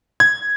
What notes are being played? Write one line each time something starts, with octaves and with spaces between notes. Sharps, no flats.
G#6